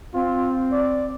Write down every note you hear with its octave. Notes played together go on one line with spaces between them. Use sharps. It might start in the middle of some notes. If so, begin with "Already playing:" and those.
C4 F4
D5